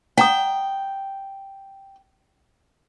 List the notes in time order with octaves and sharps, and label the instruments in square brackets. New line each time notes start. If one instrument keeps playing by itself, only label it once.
[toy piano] F#5 A#5 D#6 [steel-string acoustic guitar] G5